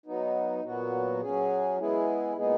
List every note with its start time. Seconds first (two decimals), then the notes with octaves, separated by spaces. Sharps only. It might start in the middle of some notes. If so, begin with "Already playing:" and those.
0.06 F#3 B3 D#4
0.63 A#2 F#3 B3 F#4
1.21 F#3 C#4 G#4
1.79 G#3 B3 E4 G#4
2.37 A#2 G#3 B3 D#4 G#4